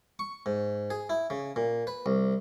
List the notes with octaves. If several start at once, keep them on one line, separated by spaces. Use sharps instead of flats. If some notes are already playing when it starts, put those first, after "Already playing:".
C#6
G#2
G#4
E4
C#3
A#2
B4
C2